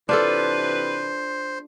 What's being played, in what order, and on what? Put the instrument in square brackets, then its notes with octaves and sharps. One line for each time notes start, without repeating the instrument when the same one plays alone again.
[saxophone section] C3 E3 B4 [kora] D4 F4 A4 [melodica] C5